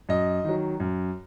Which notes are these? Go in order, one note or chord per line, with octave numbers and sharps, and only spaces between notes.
F#2 D#5
D#3 F#3
F#2